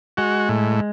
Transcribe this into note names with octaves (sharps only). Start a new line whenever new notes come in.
G#3 F#4
A2